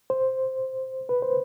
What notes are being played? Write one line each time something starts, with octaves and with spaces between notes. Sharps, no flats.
C5
B4
C5